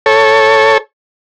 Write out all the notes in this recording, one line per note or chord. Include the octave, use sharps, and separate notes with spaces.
A4 C#5